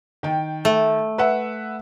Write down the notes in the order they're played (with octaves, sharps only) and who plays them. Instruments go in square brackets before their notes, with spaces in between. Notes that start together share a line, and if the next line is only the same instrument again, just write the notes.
[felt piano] D#3 G5
[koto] A3
[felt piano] B4 E5 F#5